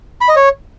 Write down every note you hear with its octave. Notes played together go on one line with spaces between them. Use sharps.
B5
D#5
C#5